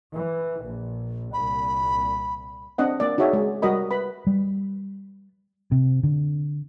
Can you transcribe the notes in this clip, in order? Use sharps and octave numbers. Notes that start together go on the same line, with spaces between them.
E3
A#1
C2 A#2 B5
C4 D4 D#5 F#5
A#3 D5
D#4 F#4 G#4 C#5 E5
G#3
G3 F#4 A#4 D#5 B5
B4 B5
G3
C3
D3